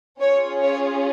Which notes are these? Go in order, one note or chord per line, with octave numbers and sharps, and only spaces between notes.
C#4 F4 G#4 C#5
C#5